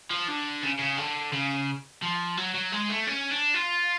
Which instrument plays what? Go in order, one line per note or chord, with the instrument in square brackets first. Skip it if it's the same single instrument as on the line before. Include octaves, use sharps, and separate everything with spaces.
[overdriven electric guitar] F3
D3
C#3
C#3
D3
C#3
F3
F#3
F#3
G#3
A3
C#4
D4
F4